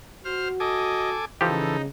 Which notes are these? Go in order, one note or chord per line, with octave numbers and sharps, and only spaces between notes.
F#4 C5 F6
A4 D#5 G#5 D6
C#3 E3 F3 D#4 G4 A4